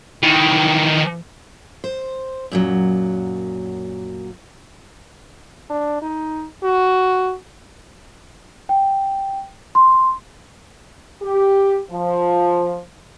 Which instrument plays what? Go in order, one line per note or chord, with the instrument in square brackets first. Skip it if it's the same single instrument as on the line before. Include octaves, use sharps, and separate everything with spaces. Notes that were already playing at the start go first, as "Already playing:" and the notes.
[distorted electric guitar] D#3 E3
[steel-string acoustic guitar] C5
F#2 A#2 F#3
[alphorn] D4
D#4
F#4
[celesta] G5
C6
[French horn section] G4
F3